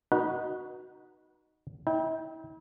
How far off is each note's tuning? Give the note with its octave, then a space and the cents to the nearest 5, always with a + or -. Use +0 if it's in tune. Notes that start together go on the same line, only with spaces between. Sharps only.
D#4 +0 F#4 +0 B4 -25
E4 -45 G5 +0